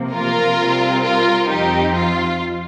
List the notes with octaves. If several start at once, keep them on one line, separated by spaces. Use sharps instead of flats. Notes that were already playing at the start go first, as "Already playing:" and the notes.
Already playing: C3 F3 A#3
F4 A#4
C3 G3 C4
F4 A#4
F2 F3 C4 D#4 G4
F4